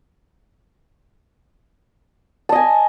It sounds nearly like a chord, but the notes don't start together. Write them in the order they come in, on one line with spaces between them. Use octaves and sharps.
A5 D#5 G#5